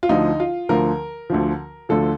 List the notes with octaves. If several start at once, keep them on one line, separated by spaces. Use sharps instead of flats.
F4
D2 D3 F3 D#4
F4
D2 D3 F3 A#4
D2 D3 F3
D2 D3 F3 A4